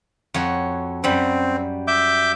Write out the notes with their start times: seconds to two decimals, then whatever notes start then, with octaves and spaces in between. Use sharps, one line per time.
0.34 F2 F#4 C#5
1.04 F#2 G3 C4 B5
1.88 E5 D6 G6